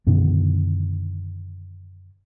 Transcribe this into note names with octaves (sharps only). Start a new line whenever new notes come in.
F#2 B2 D3 D#3